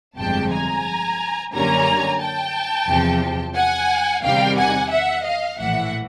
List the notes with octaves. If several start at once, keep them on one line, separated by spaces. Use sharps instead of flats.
G1 F2 C3 F3 G#3 G5 A5
G#5 A#5
F#2 D3 G3 A#3 C#4 G#5 A#5
G5 A5
E2 C3 F3
F#5 G#5
E2 C3 D#3 G3 F5 G5
F#5 G#5
E5 F#5
D#5 F5
A#1 A2 E3 E5 F#5